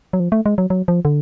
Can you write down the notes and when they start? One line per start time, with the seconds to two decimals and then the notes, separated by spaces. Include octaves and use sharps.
0.13 F#3
0.20 F3
0.32 A3
0.46 G#3
0.58 F#3
0.70 F#3
0.88 F3
1.05 D3